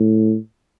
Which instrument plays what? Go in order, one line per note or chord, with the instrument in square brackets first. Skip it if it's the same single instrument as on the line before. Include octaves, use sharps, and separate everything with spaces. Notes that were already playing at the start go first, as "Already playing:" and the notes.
Already playing: [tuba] A2